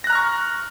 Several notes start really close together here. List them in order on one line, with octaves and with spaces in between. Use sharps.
A#6 F#6 A#5 F6 C#6